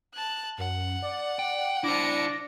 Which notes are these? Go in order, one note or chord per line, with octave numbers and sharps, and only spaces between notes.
A5 F#6
F#2 F#5
D5
G5
D4 E4 C5 A#6 C#7 D7